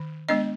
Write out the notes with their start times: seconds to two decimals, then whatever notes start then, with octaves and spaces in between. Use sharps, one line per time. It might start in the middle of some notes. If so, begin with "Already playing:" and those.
Already playing: D#3
0.29 G#3 B3 D4 D#5